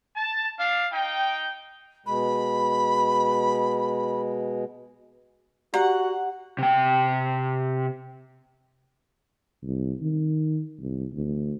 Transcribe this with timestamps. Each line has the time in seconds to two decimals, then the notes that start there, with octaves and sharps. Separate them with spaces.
0.16 A5
0.59 D4 F5
0.93 D#4 G5
2.06 B2 G#3 B5
5.74 F#4 G4 D5 F#5 A#5
6.58 C3 G5
9.63 C2
10.01 D#3
10.80 C2
11.13 D2